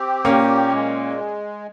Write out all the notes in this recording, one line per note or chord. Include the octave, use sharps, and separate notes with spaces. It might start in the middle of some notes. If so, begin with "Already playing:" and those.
Already playing: C4 G4
A#2 A#3 C#4
G#3